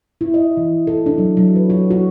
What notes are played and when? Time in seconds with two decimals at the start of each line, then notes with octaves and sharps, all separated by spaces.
0.21 E4
0.34 D#5
0.57 E3
0.87 A4
1.06 D4
1.18 F#3
1.37 F#3
1.56 B4
1.70 F#4
1.91 F#4